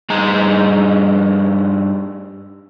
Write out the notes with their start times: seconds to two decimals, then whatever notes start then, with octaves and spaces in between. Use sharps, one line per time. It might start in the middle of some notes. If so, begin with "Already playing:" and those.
0.10 G2 D#4 G#4 A#5